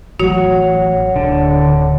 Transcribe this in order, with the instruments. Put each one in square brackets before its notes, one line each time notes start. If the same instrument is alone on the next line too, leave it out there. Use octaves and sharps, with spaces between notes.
[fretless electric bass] A1 F#3 [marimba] F#4 [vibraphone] C#5 F#5
[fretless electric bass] D1 [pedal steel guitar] D3